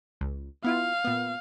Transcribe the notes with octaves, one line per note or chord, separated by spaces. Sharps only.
C#2
B3 E4 F4 F5
A#2 B3